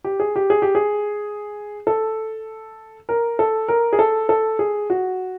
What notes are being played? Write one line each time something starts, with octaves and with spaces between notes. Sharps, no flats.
G4
G#4
G4
G#4
G4
G#4
A4
A#4
A4
A#4
G#4
A4
A4
G#4
F#4